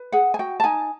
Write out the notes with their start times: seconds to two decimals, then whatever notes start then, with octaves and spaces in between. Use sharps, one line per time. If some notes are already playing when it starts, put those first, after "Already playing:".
Already playing: B4
0.12 G#4 F#5
0.34 G#5
0.39 F#4 G5
0.60 A5
0.64 D#4 G#5